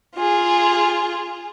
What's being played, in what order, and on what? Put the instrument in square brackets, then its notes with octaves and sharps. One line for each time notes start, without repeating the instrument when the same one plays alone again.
[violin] F4 G#4